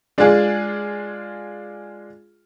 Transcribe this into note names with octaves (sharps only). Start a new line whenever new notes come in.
G#3 D4 F4 G#4 D5